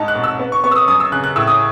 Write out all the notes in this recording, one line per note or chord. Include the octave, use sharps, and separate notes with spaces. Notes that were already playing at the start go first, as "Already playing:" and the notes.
Already playing: G#2 D#4 A5
F#6
B2
E6
B3
C#6
B3 C#6
E6
D#6
F#2 D#6
E6
C#3 F#6
F#6
A2 E6
D#6